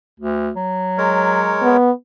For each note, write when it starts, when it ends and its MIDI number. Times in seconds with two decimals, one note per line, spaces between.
0.20 0.51 38
0.56 1.70 54
0.98 1.77 56
0.98 1.77 70
0.98 1.77 73
1.62 1.91 59